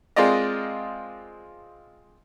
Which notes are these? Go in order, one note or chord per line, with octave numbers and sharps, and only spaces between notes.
G#3 C4 F4 A#4 D5 D#5